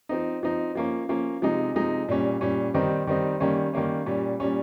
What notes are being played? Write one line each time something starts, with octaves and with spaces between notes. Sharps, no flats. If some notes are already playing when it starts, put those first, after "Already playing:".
F3 C4 D#4
F3 C4 D#4
F3 A#3 C#4
F3 A#3 C#4
C3 F3 G#3 D#4
C3 F3 G#3 D#4
A#2 G3 C#4
A#2 G3 C#4
D#3 G3 C4 D#4
D#3 G3 C4 D#4
D#3 G3 A#3 C#4
D#3 G3 A#3 C#4
A#2 G3 C#4
A#2 G3 C#4